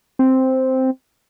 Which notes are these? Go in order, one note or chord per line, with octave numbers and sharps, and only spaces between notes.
C4